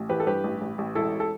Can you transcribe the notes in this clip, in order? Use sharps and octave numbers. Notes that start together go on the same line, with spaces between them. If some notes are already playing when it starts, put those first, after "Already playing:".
Already playing: A1
E3 G4 B4
A4
G2 G4 B4
A1
A1
A1
E1 E4 A4
E1
A4